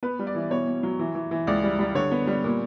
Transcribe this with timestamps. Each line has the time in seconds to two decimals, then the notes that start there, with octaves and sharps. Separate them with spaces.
0.03 B3 B4
0.19 G3
0.27 D5
0.35 E3
0.51 B2 C#5
0.67 B2
0.83 F#3
0.99 E3
1.15 E3
1.31 E3
1.47 C#2 D5
1.63 G3
1.79 G3
1.95 D3 C#5
2.11 B3
2.27 G3
2.44 A#2